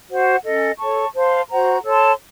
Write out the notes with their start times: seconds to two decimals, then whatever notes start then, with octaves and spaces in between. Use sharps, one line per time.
0.09 F#4 C5 F#5
0.44 C#4 A4 D#5
0.79 A4 C#5 A5 C#6
1.14 C5 F5 A5 C6
1.49 F#4 C5 F#5 A#5
1.84 A4 C#5 A5 C6